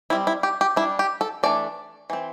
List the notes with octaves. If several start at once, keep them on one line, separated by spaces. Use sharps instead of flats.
G3 C4 E4
E4
G4
G4
G3 D4 E4
G4
A4
E3 A3 D4 D5
E3 C4